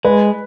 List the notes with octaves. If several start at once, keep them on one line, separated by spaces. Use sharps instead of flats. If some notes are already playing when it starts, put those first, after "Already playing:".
G#3 B4